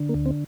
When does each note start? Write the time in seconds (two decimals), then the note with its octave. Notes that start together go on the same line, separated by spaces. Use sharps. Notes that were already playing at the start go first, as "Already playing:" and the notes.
Already playing: D3
0.09 A#3
0.14 D2
0.26 C4